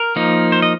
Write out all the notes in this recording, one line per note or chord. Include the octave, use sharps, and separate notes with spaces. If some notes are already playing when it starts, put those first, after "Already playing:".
Already playing: A#4
F3 A#3 D#4
C5
D#5